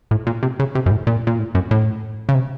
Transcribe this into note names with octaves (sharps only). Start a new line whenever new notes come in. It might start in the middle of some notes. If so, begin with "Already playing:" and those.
A2
A#2
C3
C#3
C3
F#2
A2
A#2
A#2
A2
F#2
A2
C#3
C3